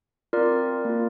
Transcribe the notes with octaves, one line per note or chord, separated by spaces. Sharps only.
C4 F4 A#4 D5
A#3 F4